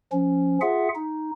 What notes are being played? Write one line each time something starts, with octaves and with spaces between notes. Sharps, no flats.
F3 C#4
F4 G#4 E5 F#5
D#4